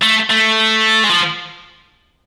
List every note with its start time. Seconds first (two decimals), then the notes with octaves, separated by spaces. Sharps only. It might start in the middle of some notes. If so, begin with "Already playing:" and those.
0.03 A3
0.31 A3
1.05 G#3
1.10 F3